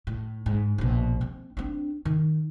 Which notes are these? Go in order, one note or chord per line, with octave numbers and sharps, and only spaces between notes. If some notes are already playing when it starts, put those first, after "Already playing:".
A2
G#2
A#1 B2
C4
C4 D4
D#3